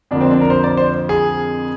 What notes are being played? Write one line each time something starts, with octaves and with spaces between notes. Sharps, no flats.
F2 D3 F3 A#3 D4
C4
D4
A#4
C5
D5
C5
G#4